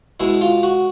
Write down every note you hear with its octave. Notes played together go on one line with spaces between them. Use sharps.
B2 G#3 E4
F4
F#4